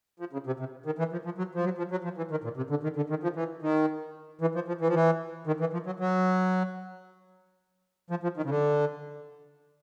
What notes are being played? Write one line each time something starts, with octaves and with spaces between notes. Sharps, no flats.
F3
C#3
C3
C3
D#3
E3
F3
F3
F#3
F3
F#3
F3
F#3
F3
E3
D#3
A#2
C3
D3
D#3
D3
D#3
F3
E3
D#3
E3
F3
F3
E3
F3
E3
D#3
E3
F3
F#3
F#3
F3
F3
D#3
C#3
D3